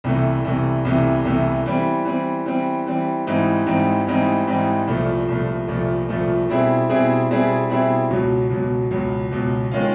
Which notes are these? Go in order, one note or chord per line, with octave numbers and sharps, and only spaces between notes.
C2 C3 E3 A3
C2 C3 E3 A3
C2 C3 E3 A3
C2 C3 E3 A3
E3 G3 C4
E3 G3 C4
E3 G3 C4
E3 G3 C4
G#2 E3 G3 C4 D#4
G#2 E3 G3 C4 D#4
G#2 E3 G3 C4 D#4
G#2 E3 G3 C4 D#4
C2 A#2 F3 A3
C2 A#2 F3 A3
C2 A#2 F3 A3
C2 A#2 F3 A3
B2 G3 C4 E4 G#4
B2 G3 C4 E4 G#4
B2 G3 C4 E4 G#4
B2 G3 C4 E4 G#4
C#2 B2 F#3
C#2 B2 F#3
C#2 B2 F#3
C#2 B2 F#3
D#3 G#3 C#4 F4